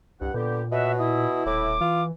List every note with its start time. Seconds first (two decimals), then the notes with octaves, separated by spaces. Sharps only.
0.21 C2 G2 F#5
0.34 A#2 D3 B3 G4
0.72 B2 C#5 D#5 E5 F#5
0.99 E4 D#6
1.46 D#1 A2 D6
1.81 E3 F4